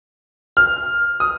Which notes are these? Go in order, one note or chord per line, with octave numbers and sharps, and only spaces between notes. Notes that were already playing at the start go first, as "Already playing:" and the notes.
F6
D#6